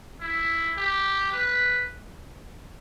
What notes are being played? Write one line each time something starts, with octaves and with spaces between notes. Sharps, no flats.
E4
G4
B4